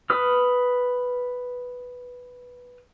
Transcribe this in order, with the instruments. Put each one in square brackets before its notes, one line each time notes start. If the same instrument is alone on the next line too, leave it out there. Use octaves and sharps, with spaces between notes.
[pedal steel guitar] B4 D#6 F6